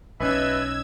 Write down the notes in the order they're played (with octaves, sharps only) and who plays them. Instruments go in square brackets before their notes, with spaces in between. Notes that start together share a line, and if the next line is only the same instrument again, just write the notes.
[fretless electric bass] B1 C#4 [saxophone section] B2 E4 B4 [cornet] D#5 [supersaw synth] E6 G#6